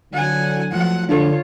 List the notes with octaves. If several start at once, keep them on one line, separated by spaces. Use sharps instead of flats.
D3 F#3 F#5 G#5
F3 F#3 A3 F#5
D3 D4 F4 A4 C#5